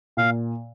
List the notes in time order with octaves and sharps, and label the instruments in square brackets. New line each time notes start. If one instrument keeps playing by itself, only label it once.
[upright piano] A#2 [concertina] F5